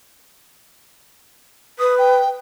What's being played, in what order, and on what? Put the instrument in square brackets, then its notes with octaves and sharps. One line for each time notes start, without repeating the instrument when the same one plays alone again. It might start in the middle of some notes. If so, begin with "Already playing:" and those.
[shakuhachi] B4 [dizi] D#6
[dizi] G5